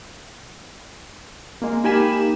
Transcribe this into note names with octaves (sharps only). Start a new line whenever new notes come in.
G#3 A#3
A#3 D#4 G4 G#5 B5 E7